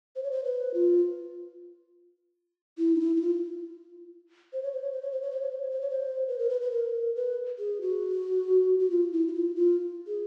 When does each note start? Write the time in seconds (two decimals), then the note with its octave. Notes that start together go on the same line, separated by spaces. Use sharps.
0.16 C5
0.23 C#5
0.31 C5
0.45 B4
0.74 F4
2.78 E4
2.95 D#4
3.00 E4
3.16 E4
3.21 F4
4.53 C5
4.63 C#5
4.73 C5
4.82 C#5
4.92 C5
5.02 C#5
5.12 C5
5.22 C#5
5.31 C5
5.41 C#5
5.51 C5
5.62 C#5
5.71 C5
5.81 C#5
5.90 C5
6.28 B4
6.39 A#4
6.50 B4
6.61 B4
6.72 A#4
7.15 B4
7.59 G#4
7.81 F#4
8.79 F#4
8.90 F4
9.12 E4
9.28 E4
9.34 F4
9.56 F4
10.07 G#4